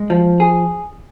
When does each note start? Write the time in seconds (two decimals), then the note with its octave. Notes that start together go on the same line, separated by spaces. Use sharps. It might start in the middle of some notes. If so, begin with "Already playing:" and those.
Already playing: G#3
0.10 F3
0.40 G#4